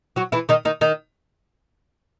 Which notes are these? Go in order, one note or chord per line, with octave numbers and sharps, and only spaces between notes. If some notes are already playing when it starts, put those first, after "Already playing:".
F#3 F#4
E3 E4
D#3 D#4
D#3 D#4
D#3 D#4